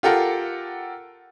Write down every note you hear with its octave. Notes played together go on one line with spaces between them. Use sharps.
F4 G4 A4 A#4 F#5